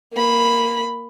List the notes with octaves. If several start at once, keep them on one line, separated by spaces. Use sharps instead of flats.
A#3 B5